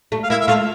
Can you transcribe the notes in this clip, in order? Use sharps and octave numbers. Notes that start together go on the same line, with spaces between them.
A3
F5
A#3 E4 E5
E5
A3 F4 F5